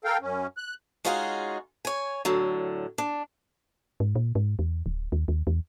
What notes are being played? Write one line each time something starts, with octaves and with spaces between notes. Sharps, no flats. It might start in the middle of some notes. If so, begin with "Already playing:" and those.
A4 A#4 F5 G5
F#2 C#4
F#6
G#3 C#4 D#4 F4 F#4 G#4
C#5 G#5
A2 D3 F#3
D4
G#2
A#2
G#2
E2
D1
D#2
D#2
E2